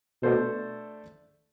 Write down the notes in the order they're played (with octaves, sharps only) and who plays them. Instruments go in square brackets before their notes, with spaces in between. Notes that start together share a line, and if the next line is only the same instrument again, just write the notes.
[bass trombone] B2 [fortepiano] A3 D4 A4 C5